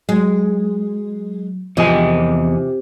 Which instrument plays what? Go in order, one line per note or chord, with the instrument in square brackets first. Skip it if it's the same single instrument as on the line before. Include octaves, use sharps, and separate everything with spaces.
[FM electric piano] F#3 [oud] G#3
[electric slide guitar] E2 D#5 G#5 [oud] C3 [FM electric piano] F3